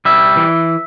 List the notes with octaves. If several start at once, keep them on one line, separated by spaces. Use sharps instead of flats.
G3 E5
E3